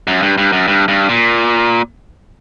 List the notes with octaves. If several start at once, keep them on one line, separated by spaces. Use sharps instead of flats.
F#2
G2
G2
F#2
G2
G2
A#2